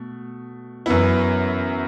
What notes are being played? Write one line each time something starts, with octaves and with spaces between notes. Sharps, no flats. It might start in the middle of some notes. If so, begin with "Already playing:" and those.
Already playing: B2 A3
F#2 E3 B3 E4